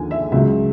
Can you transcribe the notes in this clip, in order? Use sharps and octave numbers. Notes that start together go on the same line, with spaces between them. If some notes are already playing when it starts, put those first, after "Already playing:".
Already playing: D#2 D3 F3 G#5
E5
C#2 C#3 F#3 E5